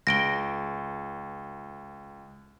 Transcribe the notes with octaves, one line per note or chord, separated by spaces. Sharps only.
C#2 A#6 D7 G7